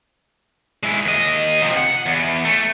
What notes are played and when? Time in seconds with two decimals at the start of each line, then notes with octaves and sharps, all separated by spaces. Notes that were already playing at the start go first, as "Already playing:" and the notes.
0.83 G#3 E4
1.05 D#2 D#5
1.62 C3 F3
1.77 F#5
2.06 E2
2.44 A3